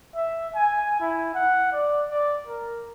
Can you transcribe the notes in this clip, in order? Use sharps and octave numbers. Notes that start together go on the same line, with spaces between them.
E5
G#5
E4
F#5
D5
D5
A#4